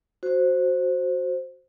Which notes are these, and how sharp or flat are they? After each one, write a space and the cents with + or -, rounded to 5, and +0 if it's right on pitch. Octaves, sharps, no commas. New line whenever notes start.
F#4 +0 C5 +5